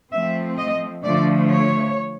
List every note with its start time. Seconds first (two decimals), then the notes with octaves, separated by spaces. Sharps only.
0.12 F3 A3 C4 E5
0.57 D#5
1.04 D3 F3 A3 D5
1.51 C#5